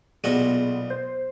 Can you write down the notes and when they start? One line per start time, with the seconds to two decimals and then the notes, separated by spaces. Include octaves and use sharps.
0.24 B1 A#2 B3 F#4 G#4
0.90 C5